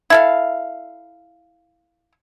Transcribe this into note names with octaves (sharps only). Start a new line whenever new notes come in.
E4 A4 F5